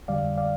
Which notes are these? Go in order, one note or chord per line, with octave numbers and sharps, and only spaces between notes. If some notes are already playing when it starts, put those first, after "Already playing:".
F2 D3 G3 D5 F5
D5 F5